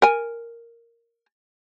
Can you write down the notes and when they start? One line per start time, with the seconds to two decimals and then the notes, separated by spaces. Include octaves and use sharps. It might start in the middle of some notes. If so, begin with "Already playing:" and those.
0.02 A#4 G#5